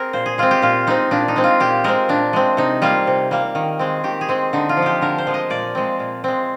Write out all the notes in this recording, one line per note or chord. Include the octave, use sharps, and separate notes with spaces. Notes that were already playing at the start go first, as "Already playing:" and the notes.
Already playing: C4 G#4 A#4
A#2 C5
G#4
G#3 C4 F4
G4
A#2 F4
G#3 C4 D#4
A#2 D4
D#4
G#3 C4
F4
A#2 G4
G#3 C4 A#4
A#2 D4
G#3 C4
C3 D#4
G3 A#3 F4
C3
G3 A#3
D#3
G#3 C4
D#3 G4
G#4
G#3 C4
D3 D#4
F4
F3
G#3 G4
D3 A#4
C5
F3 G#3
D#5
A#2 D5
G#3 C4
A#2
G#3 C4